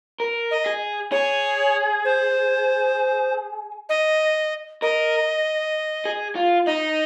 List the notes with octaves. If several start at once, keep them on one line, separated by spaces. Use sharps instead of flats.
A#4
D#5
G#4
G#4 C#5
C5
D#5
A#4 D#5
G#4
F4
D#4 D#5